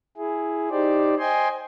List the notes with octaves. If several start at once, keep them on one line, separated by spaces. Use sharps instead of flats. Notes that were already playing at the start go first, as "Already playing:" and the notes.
E4 G#4
D#4 G4 C5 D5
C5 D#5 G5 G#5 C6